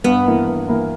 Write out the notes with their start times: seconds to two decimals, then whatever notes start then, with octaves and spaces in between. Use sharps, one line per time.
0.04 G2 B3
0.26 E3 A#3 E4 A#4
0.47 G2
0.68 E3 A#3 E4 A#4